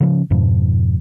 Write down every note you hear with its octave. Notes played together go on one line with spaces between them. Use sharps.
C#3 F3 C#4
F2 G#2 B2 F3